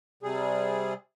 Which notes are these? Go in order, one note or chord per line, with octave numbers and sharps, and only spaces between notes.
C3 G3 G#4